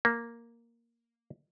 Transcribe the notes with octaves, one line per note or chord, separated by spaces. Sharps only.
A#3